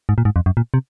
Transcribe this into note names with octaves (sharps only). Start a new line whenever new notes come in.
G#2
A#2
G#2
F2
F#2
A#2
C3